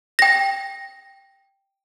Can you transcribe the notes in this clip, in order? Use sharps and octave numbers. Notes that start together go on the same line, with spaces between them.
G5 A#6